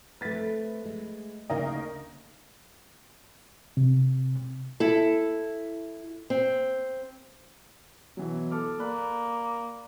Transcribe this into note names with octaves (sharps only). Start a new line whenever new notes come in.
A3 C4 B4 A6 B6
G#3
D2 C#3 A#3 D#4 A#4 D#5
C3
E4 A4
C4
B2 E3 F#3
A4 D6 F6
A#3 D5 B5 F#6